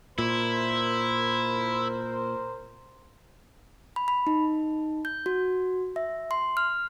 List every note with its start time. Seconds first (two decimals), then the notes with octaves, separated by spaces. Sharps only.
0.18 A#2 E4 A#4 C5
3.96 B5
4.08 B5
4.27 D#4
5.05 G6
5.26 F#4
5.96 E5
6.31 C6
6.57 F6